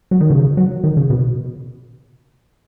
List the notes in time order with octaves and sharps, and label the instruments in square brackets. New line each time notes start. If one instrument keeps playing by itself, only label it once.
[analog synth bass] F#3
D#3
C#3
F#3
D#3
C#3
B2